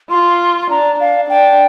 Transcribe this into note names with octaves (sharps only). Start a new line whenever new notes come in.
F4 C6
C6
D4 A#5
D4 F5
D4 G5